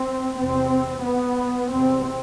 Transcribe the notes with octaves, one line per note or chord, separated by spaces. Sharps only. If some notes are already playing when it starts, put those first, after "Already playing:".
Already playing: C4
E2 C3 C4
B3
E2 C3 C4